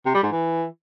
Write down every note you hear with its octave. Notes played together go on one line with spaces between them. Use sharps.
C3
G3
G#2
E3